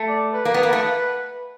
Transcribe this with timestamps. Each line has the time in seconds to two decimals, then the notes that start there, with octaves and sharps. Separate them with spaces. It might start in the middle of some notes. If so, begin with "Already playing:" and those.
Already playing: A3
0.09 D5
0.34 B4
0.45 A#3
0.54 B3
0.63 A#3
0.73 A3